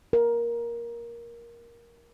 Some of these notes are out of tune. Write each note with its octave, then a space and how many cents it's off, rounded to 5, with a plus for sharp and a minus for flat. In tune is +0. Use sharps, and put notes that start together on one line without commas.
A#4 +10